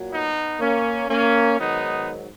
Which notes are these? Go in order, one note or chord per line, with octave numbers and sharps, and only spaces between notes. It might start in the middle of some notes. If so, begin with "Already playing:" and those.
Already playing: A#2 F#3
B3 D#4
A#3 C#4
A#3 C#4
G#2 D#3 F#3 B3 D#4